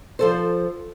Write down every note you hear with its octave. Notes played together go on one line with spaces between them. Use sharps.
F3 A4 C5